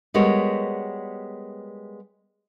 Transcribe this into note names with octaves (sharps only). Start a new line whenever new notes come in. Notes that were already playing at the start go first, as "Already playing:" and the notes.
G3 G#3 B3 F#4 A#4 C#5